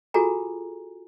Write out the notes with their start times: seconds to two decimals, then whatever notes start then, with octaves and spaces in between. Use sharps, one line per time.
0.14 F4 F#4 G#4 A4 G#5 A#5